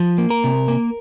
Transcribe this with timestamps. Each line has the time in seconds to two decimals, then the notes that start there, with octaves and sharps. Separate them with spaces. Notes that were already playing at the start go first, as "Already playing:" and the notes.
Already playing: F3
0.18 A#3
0.30 A#4
0.44 C3
0.68 A#3